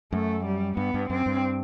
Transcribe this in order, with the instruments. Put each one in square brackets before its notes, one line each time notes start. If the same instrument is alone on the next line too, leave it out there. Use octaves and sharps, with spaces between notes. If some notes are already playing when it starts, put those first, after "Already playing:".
[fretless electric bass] F#2 [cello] A3
[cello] G3
[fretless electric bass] G2 [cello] B3
[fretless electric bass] G2
[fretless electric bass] F#2 [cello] C4
[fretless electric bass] G2